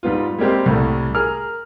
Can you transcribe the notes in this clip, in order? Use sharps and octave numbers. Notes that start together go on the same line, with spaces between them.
G#2 G3 B3 F4
G3 G#3 A#3 C4 G4
C2 A2 G3 A3
G#4 A#4 F6